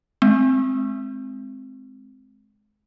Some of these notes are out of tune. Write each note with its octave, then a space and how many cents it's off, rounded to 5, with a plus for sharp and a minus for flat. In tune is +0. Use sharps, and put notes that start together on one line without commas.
G#3 +25 C4 +0